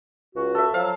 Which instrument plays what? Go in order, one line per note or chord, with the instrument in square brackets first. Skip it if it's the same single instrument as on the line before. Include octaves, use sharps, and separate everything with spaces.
[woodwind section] C#2 F#4
[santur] A4 E5
[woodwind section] F3 F#3 [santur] F5